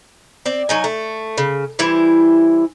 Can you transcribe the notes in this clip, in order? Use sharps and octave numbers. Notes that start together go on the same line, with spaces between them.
C4 D5
F#3 D#4 G#5
A3
C#3
E3 G3 E4 C5